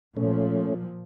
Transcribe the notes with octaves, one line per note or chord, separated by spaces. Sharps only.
A#2 F3 A3 C#4